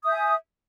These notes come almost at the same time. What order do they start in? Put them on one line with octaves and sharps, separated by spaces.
D#6 E5 G6 G#5